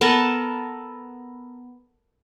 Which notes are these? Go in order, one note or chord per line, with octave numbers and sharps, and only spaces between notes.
B3 A4 A#4 A5